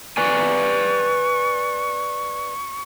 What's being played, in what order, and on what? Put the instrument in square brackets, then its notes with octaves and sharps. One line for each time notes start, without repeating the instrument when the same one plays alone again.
[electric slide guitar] B4 D5 G#5 [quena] C#6